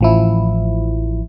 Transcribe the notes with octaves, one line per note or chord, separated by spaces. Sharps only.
A1 F3 E4